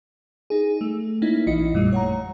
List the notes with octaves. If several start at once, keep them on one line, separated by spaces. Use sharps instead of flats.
D#4 G#4
A3
A#3 C#4 D#4 E4
A#1 E3 F4 D#5 C#7
F#2 A#2 G3 A3
C#5 F#5 A#5